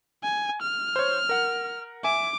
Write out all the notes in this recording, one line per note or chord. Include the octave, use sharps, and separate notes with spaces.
G#5
F6
C5 C#5
A#4 F#5
E5 G#5 D6